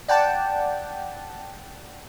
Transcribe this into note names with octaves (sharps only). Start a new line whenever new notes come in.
D5 F#5 G5 A5